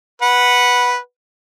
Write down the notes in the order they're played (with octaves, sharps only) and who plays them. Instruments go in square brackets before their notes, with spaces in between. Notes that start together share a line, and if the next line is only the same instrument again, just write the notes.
[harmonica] B4 F#5